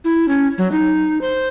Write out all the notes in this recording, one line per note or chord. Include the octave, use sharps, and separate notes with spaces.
E4
C#4
F#3
D#4
C5